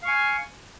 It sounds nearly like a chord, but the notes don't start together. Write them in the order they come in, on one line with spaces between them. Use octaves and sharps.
F5 C#6 G#5